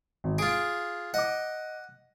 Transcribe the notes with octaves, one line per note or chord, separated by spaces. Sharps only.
G#1
F4 G#4 D7
D#5 F#5 D6